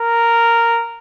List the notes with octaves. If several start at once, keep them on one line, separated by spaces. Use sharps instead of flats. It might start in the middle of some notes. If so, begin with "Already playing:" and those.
Already playing: A#4